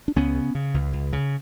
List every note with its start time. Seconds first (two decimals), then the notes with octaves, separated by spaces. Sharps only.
0.08 D4
0.16 C#2 B3 C#4
0.35 C#3
0.55 C#3
0.74 C#2
0.93 C#2
1.13 C#3